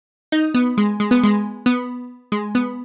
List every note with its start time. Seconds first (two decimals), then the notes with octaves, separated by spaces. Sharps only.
0.32 D#4
0.54 B3
0.78 G#3
1.00 G#3
1.11 B3
1.24 G#3
1.66 B3
2.32 G#3
2.55 B3